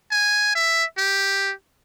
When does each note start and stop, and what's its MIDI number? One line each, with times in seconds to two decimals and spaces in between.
0.11 0.54 80
0.55 0.84 76
0.98 1.52 67